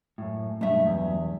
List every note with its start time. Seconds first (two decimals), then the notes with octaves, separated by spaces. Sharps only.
0.18 F#2 A2
0.61 B1 G2 A3 E5
0.86 E2